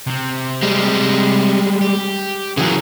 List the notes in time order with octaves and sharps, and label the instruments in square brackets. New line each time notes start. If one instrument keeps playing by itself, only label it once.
[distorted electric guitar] C3 C4
[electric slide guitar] G3 G#3
[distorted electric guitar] G4
[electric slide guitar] C#3 E3 F#3 [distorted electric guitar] G#4 A#4